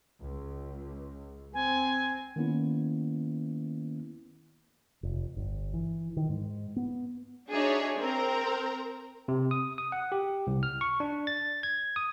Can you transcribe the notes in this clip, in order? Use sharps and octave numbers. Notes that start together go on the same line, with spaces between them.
C#2
C4 G#5
D#3 A#3 B3 C#4 E4
F1
G1
E3
D#3
G#2
B3
D4 D#4 F#4 G#4 C#5 E5
C4 A#4 A#5
C3
D#6
D#6
F#5
G4
C2
F6
C#6
D4
A6
G#6
D#6